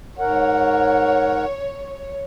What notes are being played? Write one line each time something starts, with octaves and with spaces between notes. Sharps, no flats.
G#2 A#4 C#5 F#5